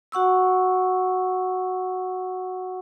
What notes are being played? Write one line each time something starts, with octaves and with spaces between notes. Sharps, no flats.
F#4 F#5 C#6 E6